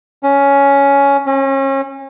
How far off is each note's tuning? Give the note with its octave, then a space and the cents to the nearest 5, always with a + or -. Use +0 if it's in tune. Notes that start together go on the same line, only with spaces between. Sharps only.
C#4 +10
C#4 -35